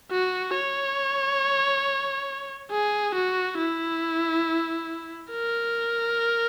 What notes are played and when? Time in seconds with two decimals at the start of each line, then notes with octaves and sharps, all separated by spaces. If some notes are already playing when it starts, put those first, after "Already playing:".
0.11 F#4
0.54 C#5
2.71 G#4
3.15 F#4
3.58 E4
5.31 A#4